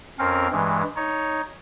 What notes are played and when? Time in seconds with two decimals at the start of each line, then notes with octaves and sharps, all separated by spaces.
0.19 F2 C4 C#4 A#4 F5
0.52 G2 E3 G#3
0.96 D#4 C#5